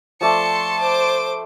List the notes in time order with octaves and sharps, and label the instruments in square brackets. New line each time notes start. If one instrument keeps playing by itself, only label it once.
[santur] F3 A3 D5 [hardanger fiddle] A5 [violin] C6 C#7
[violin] C5 D6